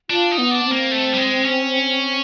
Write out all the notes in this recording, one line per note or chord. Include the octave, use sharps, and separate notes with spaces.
D4 F4
D#4
B3
D4
C4
A#3
A3
G3
G#3
C#4